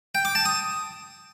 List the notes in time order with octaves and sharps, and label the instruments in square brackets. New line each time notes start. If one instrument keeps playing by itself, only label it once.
[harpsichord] G5
D6
A5
D#6